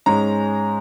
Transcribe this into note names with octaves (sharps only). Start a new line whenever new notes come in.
G#2 G#3 C#4 A#5